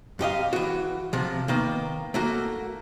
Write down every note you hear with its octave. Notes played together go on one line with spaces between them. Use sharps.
F#2 G4 D#5 F5
E3 F#4
C3 F3
D#3 A#3 B3
A3 A#3 F#4